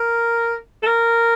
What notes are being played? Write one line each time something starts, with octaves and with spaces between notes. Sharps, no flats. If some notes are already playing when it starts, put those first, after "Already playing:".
Already playing: A#4
A4
A#4